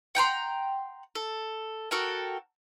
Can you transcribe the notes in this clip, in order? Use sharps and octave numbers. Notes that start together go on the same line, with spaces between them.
F#5 G5 A#5 C6
A4
F#4 A4 A#4 G5